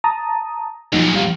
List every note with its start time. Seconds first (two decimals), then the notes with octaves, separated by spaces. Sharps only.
0.04 A5 A#5 D#6
0.93 E2 A#2 F3 F#3 D#4
1.14 G3 F5